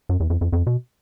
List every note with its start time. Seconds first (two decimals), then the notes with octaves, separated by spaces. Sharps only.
0.09 F#2
0.20 E2
0.30 F2
0.41 F2
0.52 F2
0.67 B2